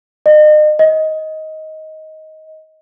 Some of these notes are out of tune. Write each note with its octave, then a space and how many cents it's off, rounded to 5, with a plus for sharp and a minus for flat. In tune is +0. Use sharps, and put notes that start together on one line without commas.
D#5 -40
D#5 +15